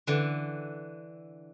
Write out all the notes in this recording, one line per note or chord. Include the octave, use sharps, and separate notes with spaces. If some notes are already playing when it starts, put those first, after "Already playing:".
D3 E3